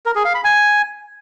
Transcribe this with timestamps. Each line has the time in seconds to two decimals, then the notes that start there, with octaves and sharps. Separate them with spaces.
0.06 A#4
0.15 G#4
0.25 F5
0.35 B5
0.44 G#5